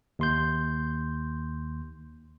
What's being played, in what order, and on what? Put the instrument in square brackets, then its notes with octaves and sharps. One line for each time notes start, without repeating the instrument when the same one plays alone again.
[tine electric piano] D#2 C6 G6